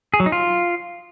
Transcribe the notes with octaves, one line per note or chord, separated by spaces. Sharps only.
G#4
F#3
D#4
F4